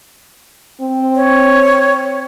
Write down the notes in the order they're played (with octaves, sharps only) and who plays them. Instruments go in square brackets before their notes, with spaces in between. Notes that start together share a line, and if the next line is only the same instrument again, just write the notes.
[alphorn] C4
[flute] C#5